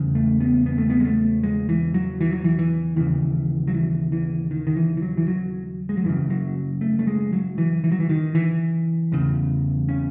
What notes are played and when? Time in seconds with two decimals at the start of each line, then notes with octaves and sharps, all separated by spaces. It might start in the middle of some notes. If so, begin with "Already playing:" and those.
Already playing: E2 C#3
0.15 A3
0.40 B3
0.66 B3
0.78 A3
0.90 B3
1.00 G#3
1.05 A3
1.43 G#3
1.69 E3
1.94 F#3
2.21 E3
2.32 F#3
2.44 E3
2.59 E3
2.96 D#2 C#3 E3
3.68 F#3
3.74 E3
4.12 E3
4.51 D#3
4.67 D#3
4.77 E3
4.97 E3
5.02 F#3
5.17 E3
5.28 F#3
5.89 G#3
5.97 F#3
6.04 F#2 C#3 E3
6.30 F#3
6.81 A3
6.99 A3
7.07 G#3
7.33 F#3
7.58 E3
7.84 E3
7.92 F#3
8.00 E3
8.09 D#3
8.35 E3
9.12 E2 C#3
9.89 C#4